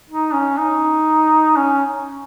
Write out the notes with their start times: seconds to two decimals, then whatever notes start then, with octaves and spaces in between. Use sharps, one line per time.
0.10 D#4
0.33 C#4
0.58 D#4
1.57 C#4